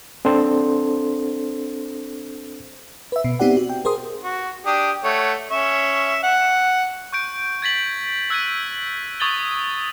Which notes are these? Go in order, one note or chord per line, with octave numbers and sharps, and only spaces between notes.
C4 D4 A4 C5
B4 E5
B2
B3 C4 D#4 G4 D5 F#5
F#4
G5
G#4 A#4 C5 C6 D#6
F#4
D4 G4 D#6
A3 C#5 F#5
C#4 E5 C#6
F#5
C#6 G6 D7
G#6 A6 B6 F#7
E6 F#6 G#6 B6 D#7
C#6 D#6 G#6 A6 F#7 G7